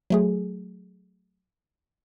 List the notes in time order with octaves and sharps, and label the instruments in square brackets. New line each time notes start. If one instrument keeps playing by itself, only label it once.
[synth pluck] F#3 A3 G#4